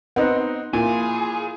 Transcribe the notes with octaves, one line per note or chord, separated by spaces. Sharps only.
B3 C4 D#4 F#5
A#2 E4 F4 G#4